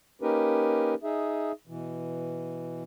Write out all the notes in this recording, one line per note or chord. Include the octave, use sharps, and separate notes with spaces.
A#3 C#4 D#4 G4 A#4 B4
D#4 G#4 E5
B2 E3